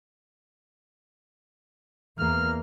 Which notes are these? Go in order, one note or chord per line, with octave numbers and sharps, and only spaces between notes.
E2 A#3 F6